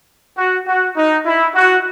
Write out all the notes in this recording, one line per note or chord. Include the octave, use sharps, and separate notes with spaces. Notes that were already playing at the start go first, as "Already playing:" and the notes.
F#4
F#4
D#4
E4
F#4